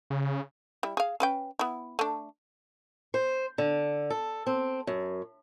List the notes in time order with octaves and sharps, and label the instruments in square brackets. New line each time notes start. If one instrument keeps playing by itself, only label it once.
[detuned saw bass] C#3
[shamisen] G3 E4
G#4 F5
C#4 B4 G5
B3 E4
A3 D4
[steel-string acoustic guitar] C5
D3
A4
C4
F#2